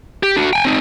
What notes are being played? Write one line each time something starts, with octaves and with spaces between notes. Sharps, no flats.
G4
D4 F#4
G5 G#5
C4 D#4